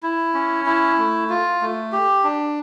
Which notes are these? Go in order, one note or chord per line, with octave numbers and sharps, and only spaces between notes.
E4
C#4
E4
A3
F4
A3
G4
D4